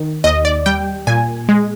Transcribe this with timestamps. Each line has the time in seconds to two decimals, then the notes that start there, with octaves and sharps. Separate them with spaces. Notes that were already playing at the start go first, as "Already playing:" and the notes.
Already playing: D#3
0.24 D#2 D#5
0.45 D5
0.66 G3 G5
1.07 A#2 G#5
1.49 G#3